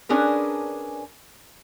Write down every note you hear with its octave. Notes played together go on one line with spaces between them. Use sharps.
C#4 D4 G#4 A#4 B4